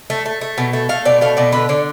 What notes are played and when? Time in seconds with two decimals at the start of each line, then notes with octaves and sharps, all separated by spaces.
0.10 A3
0.26 A3
0.41 A3
0.58 B2
0.73 A3
0.89 A3 F5
1.05 B2 D5
1.21 A3 F5
1.37 B2 D5
1.52 D3 B4
1.69 D3 D5